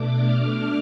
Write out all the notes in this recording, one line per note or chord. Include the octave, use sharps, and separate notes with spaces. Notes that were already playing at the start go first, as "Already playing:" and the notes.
Already playing: B2 A3 D4 D6
F6